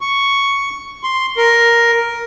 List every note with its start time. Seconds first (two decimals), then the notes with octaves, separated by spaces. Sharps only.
0.01 C#6
1.03 C6
1.37 A#4